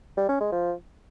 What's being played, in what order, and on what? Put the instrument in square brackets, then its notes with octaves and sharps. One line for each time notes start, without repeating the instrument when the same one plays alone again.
[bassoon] G3
C#4
G#3
F3